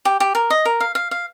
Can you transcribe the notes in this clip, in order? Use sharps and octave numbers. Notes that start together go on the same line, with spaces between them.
G4
G4
A#4
D#5
A#4
F5
F5
F5